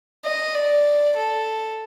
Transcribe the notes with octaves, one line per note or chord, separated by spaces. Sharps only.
D#5
D5
A4